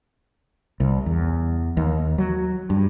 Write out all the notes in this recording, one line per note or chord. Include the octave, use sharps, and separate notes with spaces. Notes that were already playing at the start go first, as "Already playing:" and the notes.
C2
E2
D#2
F#3
G2